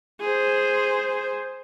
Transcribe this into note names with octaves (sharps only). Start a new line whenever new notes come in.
G#4 C5